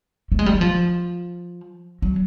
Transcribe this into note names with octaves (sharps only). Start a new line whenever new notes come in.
A3
G#3
G3
F#3
F3
F#3